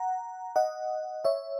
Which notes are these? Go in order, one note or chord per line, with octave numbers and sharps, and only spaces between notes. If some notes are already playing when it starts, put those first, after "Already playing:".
Already playing: F#5 A#5
D#5 F#5
C#5 E5